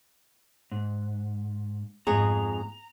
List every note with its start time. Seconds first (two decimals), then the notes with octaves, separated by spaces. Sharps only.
0.72 G#2
2.07 F2 G#2 G#4 A#5